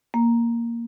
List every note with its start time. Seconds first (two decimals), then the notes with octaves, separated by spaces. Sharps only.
0.14 A#3